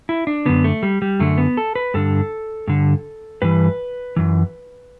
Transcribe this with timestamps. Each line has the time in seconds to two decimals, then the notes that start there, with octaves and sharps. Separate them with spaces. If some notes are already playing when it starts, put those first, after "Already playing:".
0.09 E4
0.27 D4
0.45 F#2 D3 B3
0.64 A3
0.83 G3
1.02 G3
1.19 F#2 D3 A3
1.38 B3
1.57 A4
1.75 B4
1.94 G2 D3 A4
2.67 G2 D3
3.42 G2 E3 B4
4.16 F#2 E3